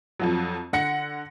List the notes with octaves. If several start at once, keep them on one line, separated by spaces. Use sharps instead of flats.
F2 F3 F#3
D3 F#5 A#6 C#7